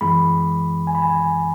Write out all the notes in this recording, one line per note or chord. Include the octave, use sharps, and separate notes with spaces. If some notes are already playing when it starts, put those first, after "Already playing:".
F#2 E3 G#3 B5
G#5
B5
G#5